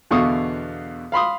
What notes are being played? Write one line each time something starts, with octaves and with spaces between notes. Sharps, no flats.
E2 B2 D3 F5 C#6 D#6
F5 B5 C6 D#6